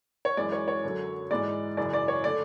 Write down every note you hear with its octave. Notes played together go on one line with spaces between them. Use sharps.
C#5
F#2 E3 G#3 D5
C#5
C#5
F#2 D3 F#3
G#2 E3 G#3 D5
F#2 C#3 E3 D5
D5
C#5
D3 A3 D5